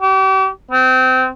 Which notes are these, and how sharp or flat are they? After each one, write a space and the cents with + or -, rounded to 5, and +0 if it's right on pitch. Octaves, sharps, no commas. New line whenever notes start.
G4 -40
C4 -25